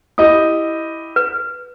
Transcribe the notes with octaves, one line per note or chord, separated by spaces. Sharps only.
E4 G4 D#5 D#6
B4